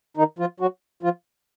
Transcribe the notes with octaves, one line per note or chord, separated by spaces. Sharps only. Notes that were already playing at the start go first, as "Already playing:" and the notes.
D#3 D#4
F3 F4
F#3 F#4
F3 F4